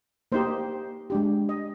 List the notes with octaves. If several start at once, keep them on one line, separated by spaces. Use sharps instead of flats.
A#3 D#4 G4 C5
G#3 D4 G4
D#5